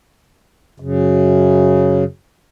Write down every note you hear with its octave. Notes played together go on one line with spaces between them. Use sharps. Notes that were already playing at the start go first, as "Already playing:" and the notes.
F#2 C#3